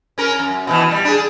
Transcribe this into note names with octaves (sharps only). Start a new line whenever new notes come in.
C#4 A#4
F#2
B2 D#3 E3
G3
D4 G#4